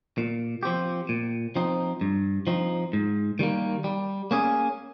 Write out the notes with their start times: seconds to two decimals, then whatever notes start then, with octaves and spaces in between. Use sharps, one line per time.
0.18 A#2
0.63 F3 C4 G4
1.09 A#2
1.56 F3 C4 D#4
2.01 G2
2.47 F3 C4 D#4
2.93 G#2
3.39 D#3 G3 A#3
3.84 G3
4.31 A#3 C#4 G#4